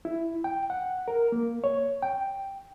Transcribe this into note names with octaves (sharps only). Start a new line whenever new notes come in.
E4
G5
F#5
A#4
A#3
C#5
G5